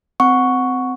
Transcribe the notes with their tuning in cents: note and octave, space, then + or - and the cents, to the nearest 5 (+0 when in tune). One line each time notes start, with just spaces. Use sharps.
C4 -25 F#5 -10 C#6 +5